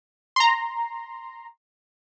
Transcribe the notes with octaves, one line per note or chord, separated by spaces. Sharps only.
A#5 C6